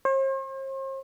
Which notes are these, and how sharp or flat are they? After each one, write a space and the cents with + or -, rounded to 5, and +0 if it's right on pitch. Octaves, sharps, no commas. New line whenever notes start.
C5 +45